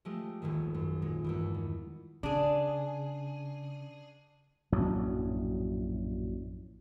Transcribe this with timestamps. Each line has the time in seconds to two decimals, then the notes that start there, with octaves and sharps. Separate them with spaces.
0.05 F3 G#3 A3 G4
0.42 D#1 A#1 G#2 D#3
0.74 F#2
1.02 A#2 G#3
1.24 E2 G2 E3
1.54 D#3
2.23 C#3 D4 G#4
4.72 A#1 F#2 A2 F#3